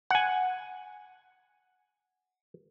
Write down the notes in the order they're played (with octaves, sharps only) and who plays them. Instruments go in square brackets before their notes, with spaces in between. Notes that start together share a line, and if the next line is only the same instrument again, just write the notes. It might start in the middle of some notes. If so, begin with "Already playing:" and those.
[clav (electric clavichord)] F#5 G#5